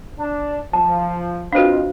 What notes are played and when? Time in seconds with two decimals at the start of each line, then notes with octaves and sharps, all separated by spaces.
0.19 D4 A5
0.73 F3 A5
1.53 C4 D4 F4 F#4 B4 C5 D#5 F5